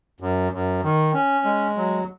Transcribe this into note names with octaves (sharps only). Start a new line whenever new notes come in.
F#2
F#2
D#3
C#4
G#3
F#3